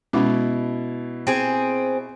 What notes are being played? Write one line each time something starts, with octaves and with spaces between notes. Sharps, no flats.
B2 G#3 C#4 E4 D6
C4 G#4